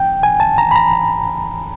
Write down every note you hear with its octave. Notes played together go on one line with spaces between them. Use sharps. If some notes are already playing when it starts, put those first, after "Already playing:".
Already playing: G5
G#5
A5
A#5
B5
A#5